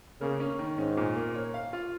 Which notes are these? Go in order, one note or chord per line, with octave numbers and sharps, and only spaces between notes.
C#3 A#3
C#4
D#3
G#2 C#4
A#2
A#3
C#5
F5
F4